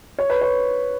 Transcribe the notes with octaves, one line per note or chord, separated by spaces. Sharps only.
C#5
B4
C#5